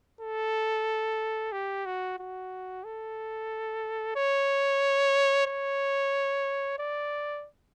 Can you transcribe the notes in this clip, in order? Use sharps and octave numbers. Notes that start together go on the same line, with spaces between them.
A4
G4
F#4
F#4
A4
C#5
C#5
D5